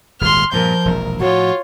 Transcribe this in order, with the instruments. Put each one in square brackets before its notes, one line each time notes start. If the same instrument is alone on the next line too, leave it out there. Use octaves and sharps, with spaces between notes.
[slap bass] D#1 G#1 G#3 [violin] C6 F6
[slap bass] G2 A#2 [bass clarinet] F3 [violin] A#4 G6
[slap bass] E1 A#1 [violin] A#4
[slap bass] A2 F3 [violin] F4 C#5 [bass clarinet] F#4